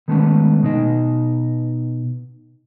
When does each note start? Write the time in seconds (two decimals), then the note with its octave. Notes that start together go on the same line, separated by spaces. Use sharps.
0.08 D#3 G#3 A3 B3 C#4
0.63 B2 D#4 D#5